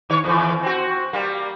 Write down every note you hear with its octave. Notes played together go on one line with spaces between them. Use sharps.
D#3 C#5
E2 A#2 E3
C4 F#4
G3 A#3